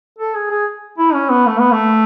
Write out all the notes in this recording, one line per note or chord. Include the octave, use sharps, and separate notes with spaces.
A4
G#4
G#4
E4
C#4
B3
A3
B3
A3